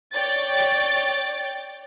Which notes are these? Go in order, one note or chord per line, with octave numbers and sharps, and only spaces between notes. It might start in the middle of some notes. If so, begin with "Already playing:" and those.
C#5 D5 G5 A6